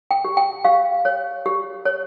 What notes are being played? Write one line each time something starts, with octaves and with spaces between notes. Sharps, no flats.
G5
G4
G5
G4 F5
C#5
G4
C#5